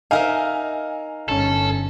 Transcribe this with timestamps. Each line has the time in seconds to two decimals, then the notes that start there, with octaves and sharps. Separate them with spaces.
0.11 D#4 A#4 E5 F5 G#5
1.29 G1 C#4 A4